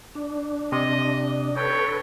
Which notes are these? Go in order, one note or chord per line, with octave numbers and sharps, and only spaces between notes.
D4
C3 D#5
A4 B4 C#5 G5